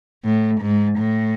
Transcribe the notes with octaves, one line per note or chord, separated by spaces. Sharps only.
A2
G#2
A2